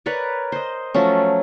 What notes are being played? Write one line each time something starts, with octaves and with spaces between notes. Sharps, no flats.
A#4 B4 C#5 D5
C5 D#5
F3 F#3 A3 C#4